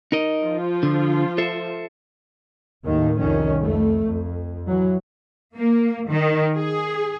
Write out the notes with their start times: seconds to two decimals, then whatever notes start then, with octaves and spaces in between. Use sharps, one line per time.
0.12 D#4 A#4 D#5
0.43 F3 F4
0.83 D3
1.38 A4 C5 E5
2.85 D#2 A2 D#3 A#3
3.18 C2 F2 D#3 C#4
3.58 F2 A3
4.07 F2
4.68 E3 F#3
5.57 A#3
6.09 D#3
6.55 G#4